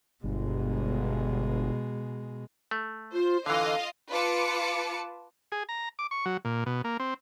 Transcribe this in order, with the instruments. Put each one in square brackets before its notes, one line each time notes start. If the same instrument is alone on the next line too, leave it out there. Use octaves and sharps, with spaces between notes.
[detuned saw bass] G1 [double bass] B2 G#3
[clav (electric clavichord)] A3
[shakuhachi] F4 [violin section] C5
[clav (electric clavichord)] D3 E3 [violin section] F4 D#5 F5 [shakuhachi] A4
[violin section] F4 B4 A5 D6 C#7
[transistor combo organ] G#4
A#5
D6
C#6
F#3
A#2
B2
A#3
C4